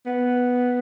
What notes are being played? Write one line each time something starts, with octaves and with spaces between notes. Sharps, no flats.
B3